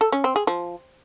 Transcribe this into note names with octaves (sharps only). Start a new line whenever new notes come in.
A4
C#4
C4
G#4
F3